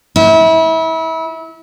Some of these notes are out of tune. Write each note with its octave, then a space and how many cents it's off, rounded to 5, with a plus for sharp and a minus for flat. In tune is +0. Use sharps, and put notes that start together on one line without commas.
E4 -30